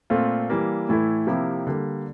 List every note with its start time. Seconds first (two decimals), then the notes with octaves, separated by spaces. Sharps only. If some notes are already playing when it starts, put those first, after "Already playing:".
0.10 A#2 A3 C4 F4
0.50 E3 G3 A#3
0.89 A2 E3 A3 E4
1.27 C3 F3 A#3 E4 G4
1.67 D3 G3 A#3